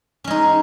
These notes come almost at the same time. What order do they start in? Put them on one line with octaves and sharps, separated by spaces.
C#4 G#3 D#4